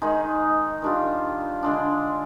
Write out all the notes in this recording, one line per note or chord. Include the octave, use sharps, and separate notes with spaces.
D#3 G#3 D#4 G#4
D#3 G3 D4 F4
D3 G#3 D4